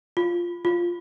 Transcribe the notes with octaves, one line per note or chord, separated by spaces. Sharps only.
F4
F4